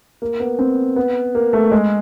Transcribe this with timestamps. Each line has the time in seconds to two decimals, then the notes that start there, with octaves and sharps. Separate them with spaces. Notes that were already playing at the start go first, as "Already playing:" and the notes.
0.22 A#3
0.40 B3
0.59 C4
0.96 B3
1.35 A#3
1.53 A3
1.72 G#3